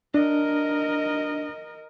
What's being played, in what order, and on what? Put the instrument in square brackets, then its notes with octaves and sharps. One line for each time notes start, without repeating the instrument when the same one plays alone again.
[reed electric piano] D4 [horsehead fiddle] A#4 D#5